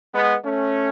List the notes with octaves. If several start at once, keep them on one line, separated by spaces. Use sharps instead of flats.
G#3 B3
A3 C#4